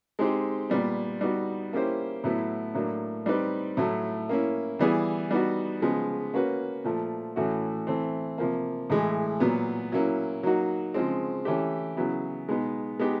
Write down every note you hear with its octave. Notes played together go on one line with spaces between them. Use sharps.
G#3 C4 D#4 G4
A#2 G3 B3
G3 B3 D#4 F#4
A#3 C#4 E4 G4 C5
A2 F#3 B3 E4
A2 F#3 A#3 D4
G3 C4 D#4 G4 B4
A2 F#3 A3
A#3 C#4 E4
E3 G3 B3 E4 G#4
G3 B3 D#4 F#4
C#3 F3 G#3 B3
A#3 C#4 F#4 B4
A#2 F3 A3
A2 E3 A3 C#4 F#4
E3 A3 C4
C3 F3 A#3
A2 E3 G#3
A#2 F#3 B3
F#3 A#3 C#4 E4
F#3 A#3 D#4 F#4
C#3 F3 G#3 C4
E3 A3 C#4 E4 G4
C#3 F#3 B3 E4
B2 G#3 B3 D#4
G#3 B3 D#4 G4